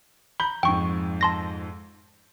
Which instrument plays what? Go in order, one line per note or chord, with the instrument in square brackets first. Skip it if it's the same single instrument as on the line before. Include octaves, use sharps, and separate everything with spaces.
[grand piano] A#5 G6 G7 [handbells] B5
[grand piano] F2 G#2 [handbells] G5 C#6
[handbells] A5 C6 A#6